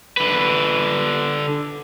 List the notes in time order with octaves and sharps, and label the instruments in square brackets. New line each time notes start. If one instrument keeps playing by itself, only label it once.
[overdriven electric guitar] D3 B4